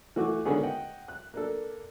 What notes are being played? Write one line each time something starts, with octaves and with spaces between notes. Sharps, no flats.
E3 A3 F#4 C#6 D6
D3 D#3 G#3 B3 C#4 G#4
D#5 F#5 G5
F#6
A#3 D4 A4